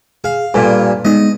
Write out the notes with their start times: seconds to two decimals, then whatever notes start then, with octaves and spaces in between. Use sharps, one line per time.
0.24 G#4 F5
0.54 G2 A#2 A4 B4 G#5
1.05 G#3 B3 D#4 D#5